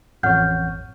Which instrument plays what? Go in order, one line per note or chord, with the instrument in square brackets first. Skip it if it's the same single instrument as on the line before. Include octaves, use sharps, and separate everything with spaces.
[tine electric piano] A1 F2 C#5 [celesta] F#5 F6 G6